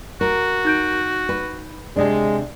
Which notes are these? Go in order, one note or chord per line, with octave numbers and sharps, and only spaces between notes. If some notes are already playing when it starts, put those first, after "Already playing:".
F#4 A#4
D#4 G6 D7
B4
C3 G#3 D4